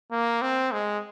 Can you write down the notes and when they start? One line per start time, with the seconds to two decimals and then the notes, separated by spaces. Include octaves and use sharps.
0.12 A#3
0.42 C4
0.72 G#3